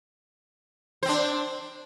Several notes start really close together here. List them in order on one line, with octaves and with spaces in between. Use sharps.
C5 C4 D4